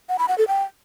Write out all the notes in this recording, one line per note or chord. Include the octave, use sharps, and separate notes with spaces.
F#5
B5
F#5
A4
G5